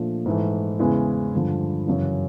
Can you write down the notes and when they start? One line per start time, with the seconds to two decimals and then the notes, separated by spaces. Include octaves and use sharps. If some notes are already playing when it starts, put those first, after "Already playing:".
Already playing: A#2 F3 A3 D4
0.26 G#2 E3 A3
0.79 E2 C#3 E3 G#3 C#4
1.33 G2 D3 F3
1.87 F#2 C#3 E3